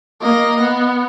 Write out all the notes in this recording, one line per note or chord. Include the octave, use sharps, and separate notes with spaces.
A#3 D#5
B3